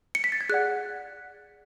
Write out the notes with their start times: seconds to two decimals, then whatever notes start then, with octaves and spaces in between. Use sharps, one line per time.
0.15 C#7
0.24 B6
0.32 A6
0.41 G#6
0.49 G#4 D5 F#5 F#6